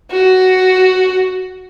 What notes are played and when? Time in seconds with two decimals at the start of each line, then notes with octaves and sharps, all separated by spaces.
0.11 F#4